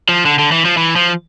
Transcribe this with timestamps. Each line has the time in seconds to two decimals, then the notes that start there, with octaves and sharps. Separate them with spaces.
0.09 F3
0.26 D3
0.39 D3
0.52 E3
0.65 F3
0.77 E3
0.96 F3